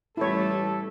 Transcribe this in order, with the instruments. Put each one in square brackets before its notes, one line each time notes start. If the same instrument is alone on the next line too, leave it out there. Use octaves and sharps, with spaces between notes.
[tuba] A1 [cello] G3 A3 [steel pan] E4 C#5 [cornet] A4